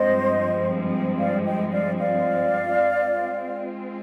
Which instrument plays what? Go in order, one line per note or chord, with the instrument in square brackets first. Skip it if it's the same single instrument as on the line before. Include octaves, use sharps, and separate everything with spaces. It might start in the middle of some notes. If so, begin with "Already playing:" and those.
Already playing: [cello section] G2 F3 G#3 C4 [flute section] C5 D#5
[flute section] D5 F5
D#5 G5
D5 F5
D5 F5
[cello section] G#3 C4 F4